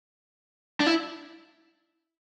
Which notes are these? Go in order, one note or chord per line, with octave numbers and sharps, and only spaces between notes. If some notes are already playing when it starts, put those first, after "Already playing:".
D4
E4